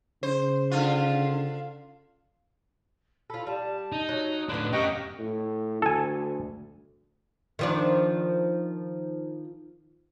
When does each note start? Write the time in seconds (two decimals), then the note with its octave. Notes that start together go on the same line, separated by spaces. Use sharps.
0.23 C#3 C5
0.71 D3 F4
3.30 F4 A4 B5
3.47 G3 A5
3.92 D#4
4.09 F#3 C#5
4.49 A2 D3 A#3 B3 D4 F#6
4.73 C#4 G4 A#4 D#5 F5 G5 C#6 F#6
5.19 A2
5.82 D2 A4 G#5
7.59 D#3 F3 D4